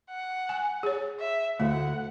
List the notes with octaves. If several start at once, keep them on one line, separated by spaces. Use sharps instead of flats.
F#5
G#5
G#4 C#5
E5
D2 A3 F#5